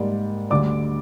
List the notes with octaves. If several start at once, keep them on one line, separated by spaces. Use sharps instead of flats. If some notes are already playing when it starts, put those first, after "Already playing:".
Already playing: G#2 G3 A#3 D5
D2 D3 G3 D5 D6